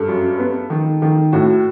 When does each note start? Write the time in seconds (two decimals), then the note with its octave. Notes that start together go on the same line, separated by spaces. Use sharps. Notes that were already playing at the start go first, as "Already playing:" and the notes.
Already playing: G2 A4
0.08 F#2
0.39 B3
0.70 D#3
1.02 D#3
1.32 A2 F#4